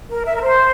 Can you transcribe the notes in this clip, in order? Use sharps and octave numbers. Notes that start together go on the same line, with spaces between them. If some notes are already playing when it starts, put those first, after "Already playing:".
A#4
E5
A#4
C5